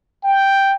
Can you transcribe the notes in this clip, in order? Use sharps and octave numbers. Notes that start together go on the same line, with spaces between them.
G5